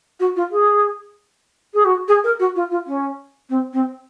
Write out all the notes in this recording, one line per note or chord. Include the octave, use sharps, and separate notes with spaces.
F#4
F4
G#4
G#4
F#4
G#4
A#4
F#4
F4
F4
C#4
C4
C4